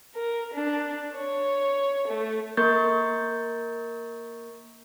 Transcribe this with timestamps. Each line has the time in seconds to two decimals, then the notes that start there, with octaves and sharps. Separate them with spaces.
0.14 A#4
0.54 D4
1.15 C#5
2.07 A3
2.57 A#3 A#4 C#6 G6 A6